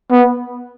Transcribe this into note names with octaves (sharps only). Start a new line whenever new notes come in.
B3